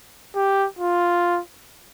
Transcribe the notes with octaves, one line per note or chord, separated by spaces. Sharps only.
G4
F4